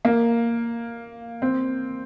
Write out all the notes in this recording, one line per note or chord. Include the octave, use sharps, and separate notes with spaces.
A#3
C4